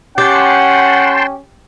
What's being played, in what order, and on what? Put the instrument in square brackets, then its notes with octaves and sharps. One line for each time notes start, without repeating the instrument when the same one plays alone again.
[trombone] C#4 [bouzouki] G4 [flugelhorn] F#5 [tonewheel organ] G5 A5 C6